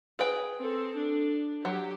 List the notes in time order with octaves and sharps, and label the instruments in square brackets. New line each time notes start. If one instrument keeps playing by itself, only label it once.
[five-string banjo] G#4 B4 G5
[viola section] C4 A4
D4
[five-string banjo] F#3 [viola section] G4